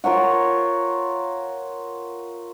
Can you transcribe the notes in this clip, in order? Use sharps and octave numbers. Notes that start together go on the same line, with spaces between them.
F4 A#4 C#5 F#5